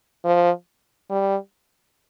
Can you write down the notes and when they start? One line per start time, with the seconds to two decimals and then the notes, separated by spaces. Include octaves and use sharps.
0.25 F3
1.10 G3